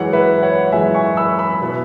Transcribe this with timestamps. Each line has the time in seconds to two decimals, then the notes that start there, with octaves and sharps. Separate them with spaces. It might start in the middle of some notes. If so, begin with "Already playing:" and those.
Already playing: F#2 E3 G#3 C#5 F#5
0.13 B4 E5
0.43 C#5 F#5
0.72 F#2 E3 G#3 E5 G#5
0.94 G#5 C#6
1.17 B5 E6
1.39 B5 E6
1.62 B2 B3 E4